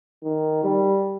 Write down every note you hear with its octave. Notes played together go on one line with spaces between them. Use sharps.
D#3
G3